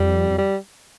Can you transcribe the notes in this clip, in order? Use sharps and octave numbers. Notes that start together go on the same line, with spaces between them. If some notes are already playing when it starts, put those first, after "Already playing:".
Already playing: F2 G3
F2
G3